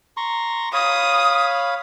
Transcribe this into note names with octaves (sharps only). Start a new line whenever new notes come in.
A#5 C6 C#6
C#5 F5 B5 D#6